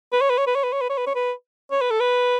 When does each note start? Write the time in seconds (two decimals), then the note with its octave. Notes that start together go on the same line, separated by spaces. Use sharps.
0.12 B4
0.21 C#5
0.30 B4
0.38 C#5
0.47 B4
0.55 C#5
0.64 B4
0.72 C#5
0.81 B4
0.90 C#5
0.98 B4
1.07 C#5
1.15 B4
1.72 C#5
1.81 B4
1.91 A4
2.00 B4